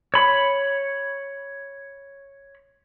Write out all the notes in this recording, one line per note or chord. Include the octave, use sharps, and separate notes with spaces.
C#5 B5